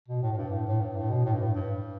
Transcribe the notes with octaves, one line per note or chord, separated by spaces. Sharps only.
B2
A2
A2
G2
A2
A2
G2
A2
B2
A2
G2
A2
G2